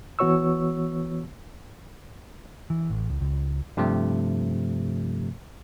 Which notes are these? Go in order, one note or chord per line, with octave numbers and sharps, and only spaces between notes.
E3 B3 F#4 C#5 C#6 E6
E3
A1
C#2
C#2
G2 C3 F3 A3